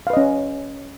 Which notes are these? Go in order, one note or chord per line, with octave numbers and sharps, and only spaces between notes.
C#4 B4 D#5 F5